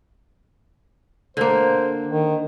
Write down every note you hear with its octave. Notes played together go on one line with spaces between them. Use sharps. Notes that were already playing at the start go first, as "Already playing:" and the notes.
D3 A#3 C5
D#3